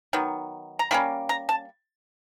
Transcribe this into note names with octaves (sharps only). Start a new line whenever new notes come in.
D#3 F#3 B3
A#5
D#3 G3 A#3 C#4 B5
A#5
A5